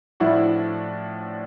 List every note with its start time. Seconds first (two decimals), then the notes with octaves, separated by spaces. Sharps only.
0.20 A2 F3 A3 D4 E4 F#4